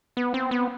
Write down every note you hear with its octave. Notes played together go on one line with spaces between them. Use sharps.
B3
C4
B3